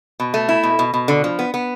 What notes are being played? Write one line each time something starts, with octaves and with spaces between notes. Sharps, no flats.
B2
A3
E4
B2
B2
B2
D3
F3
B3
B3